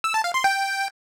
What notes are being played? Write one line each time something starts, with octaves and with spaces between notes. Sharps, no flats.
E6
A5
F5
C6
G5